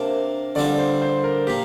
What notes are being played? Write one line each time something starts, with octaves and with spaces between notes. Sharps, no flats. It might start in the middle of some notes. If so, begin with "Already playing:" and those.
Already playing: C3 A#3 D4 A#4
D3 G3 C4 F4 D5
C5
C5
A#4
A#2 A#3 G4